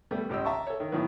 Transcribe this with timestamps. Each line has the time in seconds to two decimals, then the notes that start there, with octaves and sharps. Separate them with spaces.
0.11 G3 A3 B3
0.29 G#1 C#2 G4 D#5 E6
0.45 E5 A5 A#5 C#6
0.67 A4 C#5
0.80 D#3
0.92 A2 D#3 E3 F#3 B3